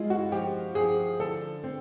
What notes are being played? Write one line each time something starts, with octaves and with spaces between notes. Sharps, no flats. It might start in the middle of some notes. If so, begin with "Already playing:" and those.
Already playing: G#3 E4 F4
F#4
F3 G4
F3 G#4
D3 A4
C4